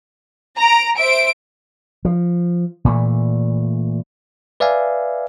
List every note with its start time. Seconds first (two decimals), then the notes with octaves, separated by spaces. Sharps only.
0.59 A#5 D7
0.96 C5 E5 D7
2.05 F3
2.85 A#2 E3 A3
4.60 B4 D5 E5 F5 G#5